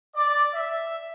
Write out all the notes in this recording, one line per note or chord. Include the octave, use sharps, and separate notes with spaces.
D5
E5